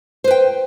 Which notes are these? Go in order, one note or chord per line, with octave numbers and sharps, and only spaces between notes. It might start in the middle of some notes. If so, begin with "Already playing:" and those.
B4 C5 G5